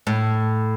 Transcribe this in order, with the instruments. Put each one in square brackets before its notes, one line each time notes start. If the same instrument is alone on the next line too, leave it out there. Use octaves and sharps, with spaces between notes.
[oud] A2